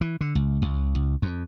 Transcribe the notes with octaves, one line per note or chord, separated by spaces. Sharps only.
E3
D3
C#2
C#2
C#2
F2